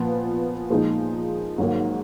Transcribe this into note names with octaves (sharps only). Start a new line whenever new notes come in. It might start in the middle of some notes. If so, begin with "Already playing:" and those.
Already playing: A#2 F3 B3
A#2 F3 G#3 D#4
G#2 D#3 F#3 A#3